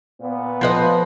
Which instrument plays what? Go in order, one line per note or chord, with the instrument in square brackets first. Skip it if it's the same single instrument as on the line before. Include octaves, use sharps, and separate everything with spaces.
[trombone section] A#2 B3
[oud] F3 B4 D#5